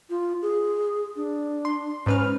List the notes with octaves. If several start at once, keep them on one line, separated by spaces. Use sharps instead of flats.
F4
G#4
D4
C6
G#2 C#4 B4 F6